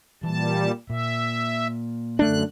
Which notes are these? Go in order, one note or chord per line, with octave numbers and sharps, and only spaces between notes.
A#2 E3 G3 A5
A#2 E5
F#2 D3 A3 D4 F#6